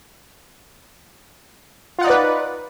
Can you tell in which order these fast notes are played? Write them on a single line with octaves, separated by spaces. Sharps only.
F4 F#5 D#4 D5 B4